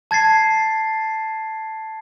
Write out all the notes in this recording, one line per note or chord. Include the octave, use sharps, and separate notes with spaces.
A5 G#6 A6 C7